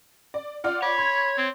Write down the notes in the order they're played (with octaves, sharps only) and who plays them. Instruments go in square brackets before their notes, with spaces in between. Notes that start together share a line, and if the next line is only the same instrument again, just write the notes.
[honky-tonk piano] D5
[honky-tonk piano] F4 D5 F#5 [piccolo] F6
[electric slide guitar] C#5 [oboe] B5 [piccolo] D6
[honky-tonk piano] C6 [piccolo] G#6
[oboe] C4